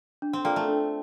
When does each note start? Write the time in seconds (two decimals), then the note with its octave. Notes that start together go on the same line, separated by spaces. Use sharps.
0.22 D4
0.33 C4
0.45 A#3 F4 A4 D5 G5
0.56 A3
0.68 D4